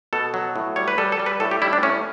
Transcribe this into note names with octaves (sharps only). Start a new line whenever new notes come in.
B2 A4
F#3
A2
G3 C#5
B4
G3 A4
A4
G3
B4
A2 A4
G4
G3 E4
D4
A2 C#4